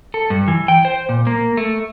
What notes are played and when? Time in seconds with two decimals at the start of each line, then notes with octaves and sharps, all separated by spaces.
0.14 A4
0.30 G2
0.48 E3
0.68 G5
0.85 C5
1.09 A#2
1.27 A#3
1.57 A3